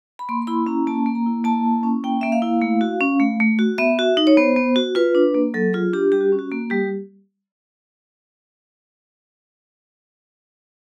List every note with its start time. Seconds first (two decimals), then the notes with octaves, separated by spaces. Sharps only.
0.19 B5
0.29 A#3 C6
0.42 C6
0.47 E4 B5
0.66 C#4 A#5
0.87 A#3 A5
1.06 A#3
1.15 A#5
1.26 E4
1.44 A#3 A5
1.65 E4
1.83 C#4
2.04 A#3 G5
2.21 A#3 E5
2.32 F5
2.42 E4
2.62 A3
2.81 F#4
3.01 C#4
3.20 A3
3.40 A3
3.59 F#4
3.78 B3 E5
3.99 F#4
4.17 D#4
4.27 C#5
4.37 B3 C5
4.56 B3
4.76 F#4
4.95 F4 B4
5.15 D4
5.35 A#3
5.54 F#3 A4
5.73 F4 G#4
5.93 D4 G4
6.12 G3 G4
6.21 F#4
6.32 C#4
6.39 F#4
6.51 A#3
6.70 G3 G4